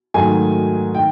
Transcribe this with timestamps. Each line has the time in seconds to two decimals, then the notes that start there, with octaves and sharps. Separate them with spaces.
0.14 G#2 D#3 F#3 A3 G#5
0.95 D#3 G5